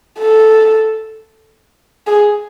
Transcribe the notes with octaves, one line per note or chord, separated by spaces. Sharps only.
A4
G#4